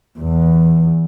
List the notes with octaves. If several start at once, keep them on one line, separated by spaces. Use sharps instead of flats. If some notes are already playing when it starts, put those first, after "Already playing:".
E2